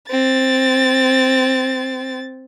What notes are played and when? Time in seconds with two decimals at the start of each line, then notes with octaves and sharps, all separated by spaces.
0.11 C4 A6